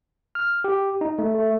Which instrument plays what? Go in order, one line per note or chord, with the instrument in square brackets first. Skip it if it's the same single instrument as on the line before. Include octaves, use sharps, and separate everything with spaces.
[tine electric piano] F6
G4
D#4
A3
A3